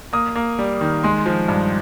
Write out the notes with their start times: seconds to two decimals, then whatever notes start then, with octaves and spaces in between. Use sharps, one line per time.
0.13 A#3 D#6
0.35 A#3
0.59 G3
0.81 D#3
1.04 G#3 C6
1.26 F3
1.48 G2